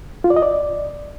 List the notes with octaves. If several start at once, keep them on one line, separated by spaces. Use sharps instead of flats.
F4
D5
D#5
D5